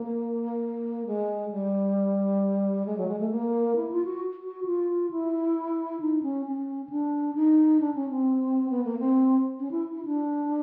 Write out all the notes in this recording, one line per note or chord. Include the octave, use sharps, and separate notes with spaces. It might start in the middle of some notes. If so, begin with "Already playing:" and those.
Already playing: A#3
G#3
G3
G#3
F#3
G#3
A3
A#3
E4
F4
F#4
F#4
F4
E4
D#4
C#4
C#4
C#4
D4
D#4
D4
C#4
C4
B3
A#3
C4
C#4
E4
E4
D4